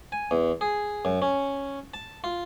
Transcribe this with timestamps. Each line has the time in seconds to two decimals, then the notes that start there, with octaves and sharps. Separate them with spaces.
0.12 G#5
0.31 E2
0.61 G#4
1.05 F#2
1.22 C#4
1.94 A5
2.24 F4